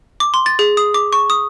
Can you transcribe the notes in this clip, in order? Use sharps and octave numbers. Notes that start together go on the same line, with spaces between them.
D6
C6
A6
G#4
D#6
D6
C#6
D#6